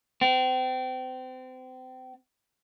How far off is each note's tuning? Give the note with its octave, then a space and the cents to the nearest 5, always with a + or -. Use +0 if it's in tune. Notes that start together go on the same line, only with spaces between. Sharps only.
C4 -30